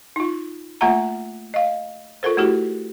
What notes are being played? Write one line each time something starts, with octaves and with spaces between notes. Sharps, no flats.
D#4 F4
A3 A#3 F4 E5 F#5 A#5
D#5 F5
F4 A4 A#4 C5
A3 E4 F#4 G4